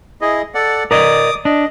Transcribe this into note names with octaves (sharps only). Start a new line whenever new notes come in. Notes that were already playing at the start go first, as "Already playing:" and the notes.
E4 G#4 D#5
A4 D5 F#5
A#4 D5 D#5 D6 D#6
D4 D#5